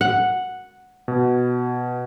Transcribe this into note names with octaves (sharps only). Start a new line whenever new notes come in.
F#5
B2